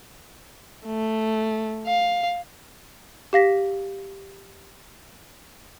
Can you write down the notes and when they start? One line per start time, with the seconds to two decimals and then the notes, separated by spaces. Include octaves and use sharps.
0.86 A3
1.87 F5
3.33 G4 F5 A#6 B6